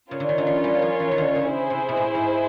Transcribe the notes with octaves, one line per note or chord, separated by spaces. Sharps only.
C#3 C#4 F4 A#4 C#5
D3
D#3
D3
E3
G3
F3
E3
D#3
D3
C#3
E4 G#4 C5
C3
B2
A2
G#2